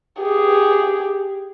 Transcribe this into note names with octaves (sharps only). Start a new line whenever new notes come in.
G4 G#4